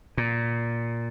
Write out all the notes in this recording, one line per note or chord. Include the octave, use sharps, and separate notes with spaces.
A#2